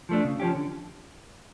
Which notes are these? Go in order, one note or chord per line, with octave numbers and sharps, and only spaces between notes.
F3 A3 D4
C#3
F3 C#4 G4
D3